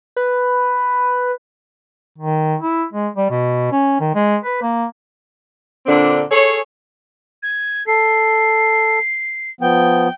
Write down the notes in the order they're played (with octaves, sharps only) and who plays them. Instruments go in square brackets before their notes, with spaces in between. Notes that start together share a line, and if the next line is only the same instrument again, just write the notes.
[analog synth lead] B4
[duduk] D#3
E4
G#3
G3
B2
C#4
D#3
G#3
B4
A#3
[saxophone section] A#2 D3 C4 D4
G#4 A4 C#5
[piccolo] G#6
[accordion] A4 [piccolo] C7
[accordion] F3 B3 [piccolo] G5